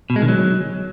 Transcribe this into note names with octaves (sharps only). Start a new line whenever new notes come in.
B2
G#3
D#3
F#3